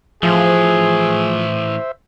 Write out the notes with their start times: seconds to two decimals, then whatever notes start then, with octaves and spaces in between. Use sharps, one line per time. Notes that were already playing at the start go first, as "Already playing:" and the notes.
0.23 A2 E3 F3 G#4 C5 E5